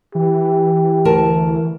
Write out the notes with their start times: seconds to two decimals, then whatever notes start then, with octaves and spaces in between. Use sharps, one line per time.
0.15 E3 G4
1.05 D2 A#4 A5